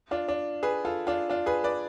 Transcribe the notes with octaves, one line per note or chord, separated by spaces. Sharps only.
D4 F4
D4
G#4 B4
F4 A4
D4 F4
D4 F4
G#4 B4
B4 D5